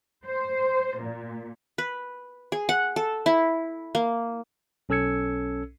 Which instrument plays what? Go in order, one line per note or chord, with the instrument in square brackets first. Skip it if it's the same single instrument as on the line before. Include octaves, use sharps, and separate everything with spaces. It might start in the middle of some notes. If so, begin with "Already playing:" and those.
[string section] C5
A#2
[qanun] B4
G#4
F#5
A4
E4
A#3
[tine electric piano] B1 C#4 A4 E6 G#6 C#7